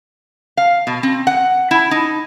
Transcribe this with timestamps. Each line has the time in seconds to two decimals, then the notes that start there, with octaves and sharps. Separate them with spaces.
0.57 F5
0.87 B2
1.03 C4
1.27 F#5
1.71 E4
1.91 D#4